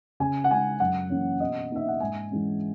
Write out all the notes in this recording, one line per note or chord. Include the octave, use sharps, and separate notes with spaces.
C#3 G#5
F#5
G#3 C#4 G#5
F#2 F#5
E3 A#3 C#4
B2 D#5
A#3 D#4 E5
F#5
G#2 G#5
E3 G#3 C#4